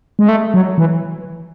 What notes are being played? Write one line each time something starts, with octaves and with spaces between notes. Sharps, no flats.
G#3
A3
F#3
E3